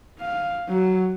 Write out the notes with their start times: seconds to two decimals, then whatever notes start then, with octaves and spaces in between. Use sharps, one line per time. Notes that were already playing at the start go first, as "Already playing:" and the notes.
0.20 F5
0.69 F#3